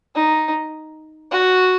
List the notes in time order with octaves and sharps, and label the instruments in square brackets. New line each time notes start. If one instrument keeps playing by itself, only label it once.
[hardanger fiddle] D#4
F#4